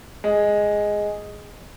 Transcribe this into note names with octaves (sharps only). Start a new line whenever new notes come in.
G#3